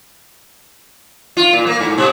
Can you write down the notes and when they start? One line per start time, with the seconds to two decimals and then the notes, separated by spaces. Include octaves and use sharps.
1.37 F4
1.53 A#2
1.67 A#3
1.80 G#2
1.98 B2